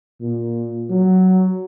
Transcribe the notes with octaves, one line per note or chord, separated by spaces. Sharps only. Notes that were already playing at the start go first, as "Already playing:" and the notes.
A#2
F#3